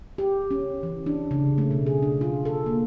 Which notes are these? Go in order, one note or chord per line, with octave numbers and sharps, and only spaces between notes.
G4
C#4
E3
D4
C#3
A3
B2
G#4
D4
F4
A4
A#3